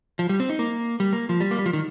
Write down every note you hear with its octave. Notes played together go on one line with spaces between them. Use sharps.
F3
G3
C4
D#4
A#3
G3
A#3
F3
G3
A#3
G3
F3
D#3